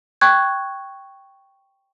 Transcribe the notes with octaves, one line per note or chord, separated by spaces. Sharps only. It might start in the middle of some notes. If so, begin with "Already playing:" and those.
G5 C#6 F#6 G#6